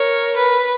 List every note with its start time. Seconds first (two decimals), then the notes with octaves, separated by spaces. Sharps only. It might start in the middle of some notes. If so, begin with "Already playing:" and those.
Already playing: A#4 C#5
0.37 B4